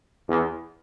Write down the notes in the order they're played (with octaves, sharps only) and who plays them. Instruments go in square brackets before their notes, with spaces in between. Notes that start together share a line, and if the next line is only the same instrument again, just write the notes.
[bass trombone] E2